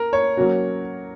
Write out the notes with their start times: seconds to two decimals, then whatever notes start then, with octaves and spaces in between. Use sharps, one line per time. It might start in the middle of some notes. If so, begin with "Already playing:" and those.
Already playing: A#4
0.13 C#5
0.37 F#3 A#3 C#4 F#4